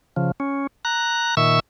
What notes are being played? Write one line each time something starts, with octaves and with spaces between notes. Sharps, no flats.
C#3 F3
C#4
A#5 F#6
A#2 D#3 E5 C#6 E6